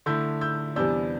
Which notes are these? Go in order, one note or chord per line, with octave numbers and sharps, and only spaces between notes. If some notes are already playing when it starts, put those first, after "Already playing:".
D3 A3 E4 E6 G6
E6 G6
E2 C3 G3 B3 D4 E6 G6